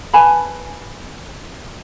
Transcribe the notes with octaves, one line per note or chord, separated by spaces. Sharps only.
B4 G#5 A5 B5